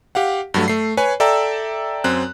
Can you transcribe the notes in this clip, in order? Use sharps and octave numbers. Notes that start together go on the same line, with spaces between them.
G4 F5 F#5
G2 F#3 A3
A3 C7
B4 C#5 G#5
A4 D5 E5 G5 A#5 E6
F#2 C4 F#6